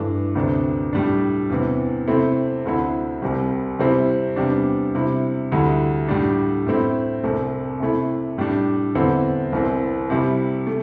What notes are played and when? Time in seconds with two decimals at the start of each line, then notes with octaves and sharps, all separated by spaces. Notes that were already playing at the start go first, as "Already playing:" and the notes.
Already playing: G2 E3 A3 D4
0.35 D2 C3 A3 D4
0.93 A2 G3 D4
1.50 E2 C3 E3
2.08 C3 A3 C4 E4
2.65 D2 D3 C4 E4
3.22 C2 C3 G3
3.79 C3 G3 C4 E4
4.36 E2 C3 G3 D4
4.95 C3 G3 E4
5.52 D2 D3 G3 E4
6.08 A2 G3 D4
6.66 A2 A3 C4 E4
7.24 C2 C3 A3
7.80 C3 A3 E4
8.38 A2 G3 D4
8.95 E2 D3 C4 E4
9.53 C2 C3 E3 C4
10.10 C3 G3 E4
10.67 A3